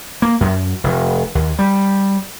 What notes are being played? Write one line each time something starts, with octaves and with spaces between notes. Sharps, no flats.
A#3
F#2
F1
D#2
G3